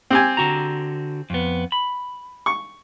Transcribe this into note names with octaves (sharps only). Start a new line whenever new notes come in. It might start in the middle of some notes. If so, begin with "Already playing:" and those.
C4 G4 G#5
D3 F#4 A#5
F2 B3
B5
C#6